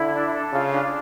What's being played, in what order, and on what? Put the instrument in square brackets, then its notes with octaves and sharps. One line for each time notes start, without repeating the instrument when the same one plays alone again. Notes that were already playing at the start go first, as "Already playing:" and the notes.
Already playing: [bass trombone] D3 [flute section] E4
[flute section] D4
A4
[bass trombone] C#3 [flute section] F4
[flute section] D4